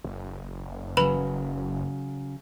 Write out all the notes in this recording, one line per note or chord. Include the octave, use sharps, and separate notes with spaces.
F#1
C#3 F#3 B4 B5 F7